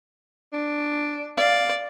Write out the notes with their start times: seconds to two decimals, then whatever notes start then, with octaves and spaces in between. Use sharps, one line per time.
0.53 D4
1.37 D5 F5